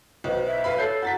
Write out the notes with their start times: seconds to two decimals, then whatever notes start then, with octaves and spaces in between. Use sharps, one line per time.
0.24 B1 B4 C5 D#5
0.46 E5
0.64 B4 F5 B5
0.78 A4 C#5 G6 C7
1.02 F#4 F#5 A#5 A6 B6